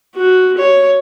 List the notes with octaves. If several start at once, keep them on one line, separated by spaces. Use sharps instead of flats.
F#4
C#5